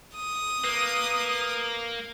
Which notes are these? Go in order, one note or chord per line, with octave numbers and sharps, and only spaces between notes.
D#6
A#3 B4